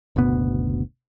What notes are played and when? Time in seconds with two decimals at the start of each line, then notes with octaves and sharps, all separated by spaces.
0.16 F#1 D2 B2 B3